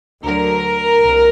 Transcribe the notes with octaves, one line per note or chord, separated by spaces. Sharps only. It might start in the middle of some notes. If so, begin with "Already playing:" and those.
D2 D3 F#3 A#4
C2